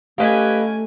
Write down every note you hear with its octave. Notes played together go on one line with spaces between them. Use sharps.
A3 C#4 G4 B4 D#5 F5 G#5